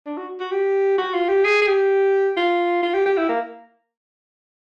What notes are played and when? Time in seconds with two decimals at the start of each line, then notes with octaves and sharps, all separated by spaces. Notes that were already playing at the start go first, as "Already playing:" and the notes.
0.06 D4
0.17 F#4
0.40 F#4
0.52 G4
0.98 F#4
1.14 F4
1.29 G4
1.44 G#4
1.62 G#4
1.67 G4
2.37 F4
2.83 F4
2.94 G4
3.06 G4
3.18 E4
3.29 A#3